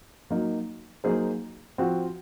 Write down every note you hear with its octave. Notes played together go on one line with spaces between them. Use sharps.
F#3 A#3 D#4
F#3 A#3 D#4 G#4 C5
F3 C4 F#4